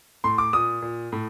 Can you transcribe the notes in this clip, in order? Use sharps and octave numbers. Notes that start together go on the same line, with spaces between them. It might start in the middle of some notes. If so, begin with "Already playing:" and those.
A2 C6
D6
A#2 D#6
A#2
A2